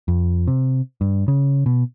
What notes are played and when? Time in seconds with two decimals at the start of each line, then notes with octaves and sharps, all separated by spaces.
0.08 F2
0.47 C3
1.01 G2
1.28 C#3
1.66 B2